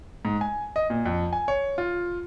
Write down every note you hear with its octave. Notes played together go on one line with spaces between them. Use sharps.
G#2
G#5
D#5
A#2
F2
G#5
C#5
F4